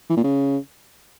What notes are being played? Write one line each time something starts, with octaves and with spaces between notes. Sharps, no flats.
E3
A#2
C#3